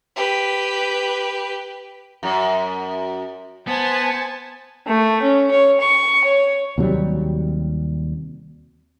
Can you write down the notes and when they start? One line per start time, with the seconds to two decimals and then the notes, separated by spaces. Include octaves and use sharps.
0.16 G4 B4
2.23 F#2
3.67 B3 C5 G#5 A5
4.87 A3
5.23 C#4
5.51 C#5
5.81 C#6
6.25 C#5
6.78 D#2 C3 F#3 G3